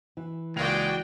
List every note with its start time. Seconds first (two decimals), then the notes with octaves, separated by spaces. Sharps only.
0.17 E3
0.56 C#2 G#3 A#3 F#4 D5 G5 F7